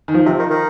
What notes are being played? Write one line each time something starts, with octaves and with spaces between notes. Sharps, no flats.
D#3
F3
C3
D#3
D#3